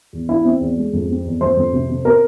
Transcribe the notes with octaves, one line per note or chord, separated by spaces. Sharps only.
E2
E2 E4 E5
C4
E2
G#3
F2
C4
E2
F2 C5 C6
F2
C3
C3
C4 A#4 A#5